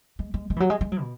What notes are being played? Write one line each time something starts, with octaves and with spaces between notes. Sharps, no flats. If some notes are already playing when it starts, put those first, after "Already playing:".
G#3
G#3
G#3
E3
F#3
G#3
G#3
F#3
B2